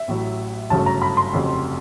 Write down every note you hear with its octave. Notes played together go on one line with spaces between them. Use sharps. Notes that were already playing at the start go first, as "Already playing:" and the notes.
Already playing: E5
A1 A2 F#3
G1 F#2 C#3 F#3 A3 A5
A#5
B5
C6
F1 F2 C#3 F#3